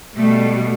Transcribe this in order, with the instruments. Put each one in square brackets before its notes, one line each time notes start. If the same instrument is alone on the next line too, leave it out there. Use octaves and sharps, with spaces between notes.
[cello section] B2 G3 A3